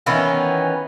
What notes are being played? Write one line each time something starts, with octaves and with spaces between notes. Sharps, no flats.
D#3 E3 B3 C#4